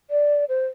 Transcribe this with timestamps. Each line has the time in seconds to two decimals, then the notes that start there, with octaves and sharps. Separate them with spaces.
0.10 D5
0.49 C5